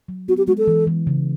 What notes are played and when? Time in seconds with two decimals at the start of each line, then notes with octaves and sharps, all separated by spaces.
0.08 F#3
0.28 B3 F#4
0.38 G4
0.48 G#3 F#4
0.58 A4
0.67 E3
0.87 E3
1.07 C#3